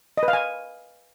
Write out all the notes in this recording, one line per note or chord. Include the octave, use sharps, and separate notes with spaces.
D#5
B4
F5
G#5